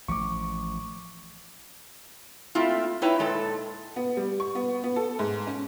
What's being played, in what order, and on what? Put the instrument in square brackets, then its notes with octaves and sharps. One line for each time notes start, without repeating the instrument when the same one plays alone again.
[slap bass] A1 F3 [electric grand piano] C#6 D6
[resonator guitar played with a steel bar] A3 A#3 C4 E4 F4
D#4 E4 B4 C#5 G5
A#2 G#3 A4
[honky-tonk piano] B3
G3
C#6
B3
B3
A4
G#2
C#4